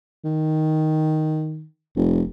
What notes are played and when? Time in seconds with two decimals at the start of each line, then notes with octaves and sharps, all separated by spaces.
0.24 D#3
1.96 F1